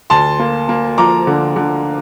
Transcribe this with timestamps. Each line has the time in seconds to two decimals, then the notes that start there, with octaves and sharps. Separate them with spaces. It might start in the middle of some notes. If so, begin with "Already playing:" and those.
0.10 D2 A5 C6
0.39 A#3
0.69 A#3
0.98 F3 A#5 D6
1.27 D3
1.56 D3